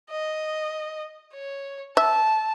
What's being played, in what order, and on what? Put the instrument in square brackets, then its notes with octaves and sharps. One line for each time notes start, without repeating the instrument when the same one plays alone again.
[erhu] D#5
C#5
[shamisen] E5 [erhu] A5